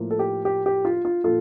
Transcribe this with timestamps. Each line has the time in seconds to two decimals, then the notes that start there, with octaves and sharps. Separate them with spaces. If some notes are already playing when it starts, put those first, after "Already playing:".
Already playing: A2 F3 A#3
0.11 A4
0.19 G4
0.45 G4
0.66 G4
0.85 F4
1.05 F4
1.24 A#2 F3 F4 A4